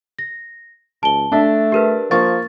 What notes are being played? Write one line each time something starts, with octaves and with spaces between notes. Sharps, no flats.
A#6
C#2 A5 G7
A3 D4 E5
G4 A#4 B4
F3 A#3 C#6 A6